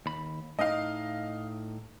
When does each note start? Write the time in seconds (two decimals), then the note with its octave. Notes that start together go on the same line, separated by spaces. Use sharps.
0.06 D#2 B5
0.59 A2 D#4 D#5 F5